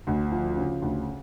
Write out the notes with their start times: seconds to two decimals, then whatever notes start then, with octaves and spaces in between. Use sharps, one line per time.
0.07 D2
0.31 F3
0.57 C#3
0.82 D2